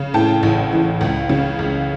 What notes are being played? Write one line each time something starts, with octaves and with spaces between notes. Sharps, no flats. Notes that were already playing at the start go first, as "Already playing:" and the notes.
Already playing: C#3
A2 G5 A5
A1
E3
C#2
C#3
C#2